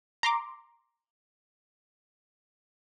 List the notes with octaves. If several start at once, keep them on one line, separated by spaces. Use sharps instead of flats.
A#5 C6 D6